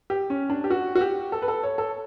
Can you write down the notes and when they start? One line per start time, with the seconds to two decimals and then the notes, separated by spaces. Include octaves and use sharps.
0.10 G4
0.30 C#4
0.50 D4
0.64 G4
0.70 F#4
0.95 F#4
1.01 G4
1.32 A4
1.42 B4
1.48 A4
1.63 C#5
1.78 A4